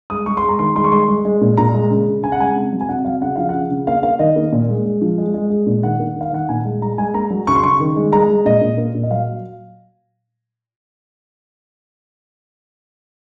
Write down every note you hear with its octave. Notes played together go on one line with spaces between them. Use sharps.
G#3 D#6
G#3 C#6
C6
G#3
A#5
D#3 C6
G#3 C6
C#6
G#3 C6
G#3
G#3
A#2
A#2 A#5
G#3
C#3
C#3
C#3 G#5
F#5
G#3 G#5
C3
F#3
G#5
C3 F#5
F#3 F5
C#3 F#5
F3 F5
C#3 F#5
C#3
A#3 F5
A#3 F5
D#3 D#5
A#3
A#2
G#3
G#3
F3
G#3
G#3
G#3
A#2
D#3 F#5
A#3
D#3 F5
D#3 F#5
A#2 G#5
G#3
G#3 A#5
G#3 G#5
A#3 A#5
F#3
C#3 C#6
C6
C#3 C#6
D#3
G#3
G#3 A#5
G#3
A#2 D#5
A#2
A#3
A#2
D#5
F#3 F5